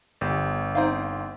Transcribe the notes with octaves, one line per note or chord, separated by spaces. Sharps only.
G1 G4
C4 D#4 F5